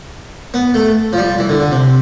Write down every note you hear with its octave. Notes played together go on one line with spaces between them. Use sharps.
B3
A3
F3
G3
E3
D3
D3
C3